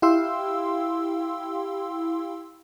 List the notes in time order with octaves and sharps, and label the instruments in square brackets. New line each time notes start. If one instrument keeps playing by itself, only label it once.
[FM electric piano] E4 G4 F5 G5 C6 E6